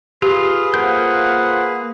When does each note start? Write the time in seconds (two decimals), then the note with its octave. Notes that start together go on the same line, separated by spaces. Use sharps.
0.22 F4 G4 G#4 B4
0.74 A#3 F4 A#4 C5 F#5 G6